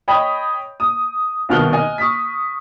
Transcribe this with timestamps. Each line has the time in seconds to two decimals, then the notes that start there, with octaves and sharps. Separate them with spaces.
0.08 C#5 D#5 G5 B5 D#6
0.80 D#6
1.49 C2 B2 D#3 F6 F#6 G7
1.73 D#5 G#5
1.98 C#6 D#6 B6